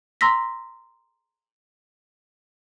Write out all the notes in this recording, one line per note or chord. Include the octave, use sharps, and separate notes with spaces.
A#5 C6 E6 A#6 B6